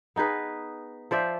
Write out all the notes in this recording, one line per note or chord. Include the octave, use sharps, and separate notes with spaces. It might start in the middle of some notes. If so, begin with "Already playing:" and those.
B3 D#4 G#4 B4
F3 C5 D5 E5